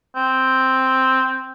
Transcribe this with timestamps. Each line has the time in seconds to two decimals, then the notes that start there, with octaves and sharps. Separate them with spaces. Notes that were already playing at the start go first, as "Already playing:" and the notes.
0.16 C4